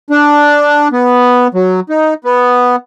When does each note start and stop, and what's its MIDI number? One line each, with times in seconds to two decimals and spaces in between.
0.10 0.88 62
0.92 1.47 59
1.54 1.80 54
1.89 2.14 63
2.24 2.76 59